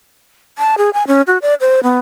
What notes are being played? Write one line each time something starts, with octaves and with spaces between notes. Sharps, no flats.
A5
G#4
G#5
C#4
F#4
D5
C5
B3